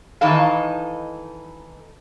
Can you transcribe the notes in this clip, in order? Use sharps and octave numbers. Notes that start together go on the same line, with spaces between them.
D#3 E3 D#4 A4 F5